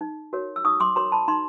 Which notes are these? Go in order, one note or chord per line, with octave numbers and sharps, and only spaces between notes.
D#4
F#4 A#4 C#5
E6
D#4 C#6 D#6
C6 D6
F#4 A#4 C#5 A#5 C6
A5 B5
D#4 A#5 C6